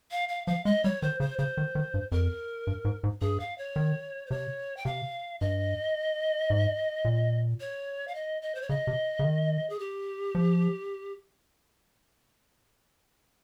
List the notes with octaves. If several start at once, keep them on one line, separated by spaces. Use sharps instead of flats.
F5
F5
F3 F5
G#3 D#5
G3 C#5
D#3 C5
C#3 C5
C#3 C5
D#3
D#3
G2
F2 A#4
G2
G#2
G#2
G2 G#4
F5
C#5
D#3
C5
C3 C#5
G5
C3 F5
G2 D#5
G#2
A#2
C#5
F5
D#5
D#5
C5
C#5
C#3 D#5
C3
C#3
D#3
G#4
G4
F3